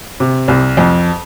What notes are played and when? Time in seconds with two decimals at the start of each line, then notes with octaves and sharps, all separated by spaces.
0.20 C3
0.48 C2
0.77 F2